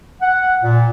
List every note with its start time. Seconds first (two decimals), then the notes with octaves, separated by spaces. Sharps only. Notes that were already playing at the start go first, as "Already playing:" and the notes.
0.22 F#5
0.63 A#2